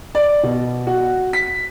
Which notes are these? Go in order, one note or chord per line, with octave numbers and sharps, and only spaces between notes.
D5
B2
F#4
B6